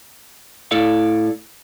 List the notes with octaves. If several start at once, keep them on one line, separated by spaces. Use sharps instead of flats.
A2 E4 A4 D5 F5